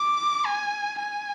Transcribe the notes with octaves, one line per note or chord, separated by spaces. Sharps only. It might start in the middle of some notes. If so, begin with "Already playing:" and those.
Already playing: D6
G#5
G#5